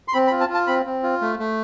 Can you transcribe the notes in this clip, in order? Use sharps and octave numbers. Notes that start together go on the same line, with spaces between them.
C6
C4 B5
B5
F4
A5
F4
A5
C4 B5
C4
F4
A3
A3